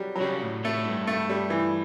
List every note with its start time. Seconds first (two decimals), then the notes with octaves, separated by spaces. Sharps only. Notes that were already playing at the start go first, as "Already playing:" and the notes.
Already playing: F#3 G3
0.15 F#3
0.21 C#3 G3
0.43 A2
0.65 A2 A3
0.86 G2
1.07 A3
1.29 G3
1.50 E3